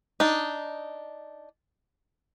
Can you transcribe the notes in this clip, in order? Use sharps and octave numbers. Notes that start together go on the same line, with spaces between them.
D4 D#4